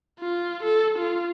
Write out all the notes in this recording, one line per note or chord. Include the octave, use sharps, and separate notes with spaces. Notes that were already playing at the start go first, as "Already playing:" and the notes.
F4
A4
F4